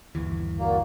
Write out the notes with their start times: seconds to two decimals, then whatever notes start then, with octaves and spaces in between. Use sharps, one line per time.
0.15 G1 D#2 E3
0.59 A#3 F#4 A#4 D5